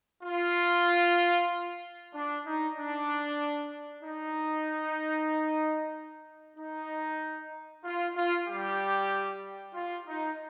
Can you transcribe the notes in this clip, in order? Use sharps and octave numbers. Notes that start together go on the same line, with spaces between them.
F4
D4
D#4
D4
D#4
D#4
F4
F4
G3 G4
F4
D#4